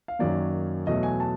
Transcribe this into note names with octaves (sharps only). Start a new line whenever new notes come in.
F5
F#2 D#3 F#3 A#3 D5
E2 B2 F#3 A3 D#5
G#5
A5